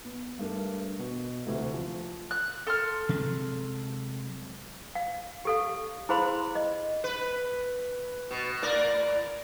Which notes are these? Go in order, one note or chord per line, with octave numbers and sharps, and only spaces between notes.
B3
G2 A3 D4 A#4
B2
D2 C3 E3 A3
F3
F#6
A4 C6 F6
C3 F#3 G#3
F5
G4 A4 F5
E4 G#4 C5 F5 B5 C6
D#5
B4
B2
A2 A#4 D5